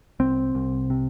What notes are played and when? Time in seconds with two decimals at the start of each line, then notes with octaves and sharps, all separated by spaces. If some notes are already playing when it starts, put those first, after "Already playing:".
0.20 C2 C4
0.55 C2
0.90 C3